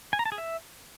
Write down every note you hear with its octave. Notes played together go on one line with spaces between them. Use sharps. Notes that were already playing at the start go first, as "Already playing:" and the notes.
G#5
A#5
A5
G#4
E5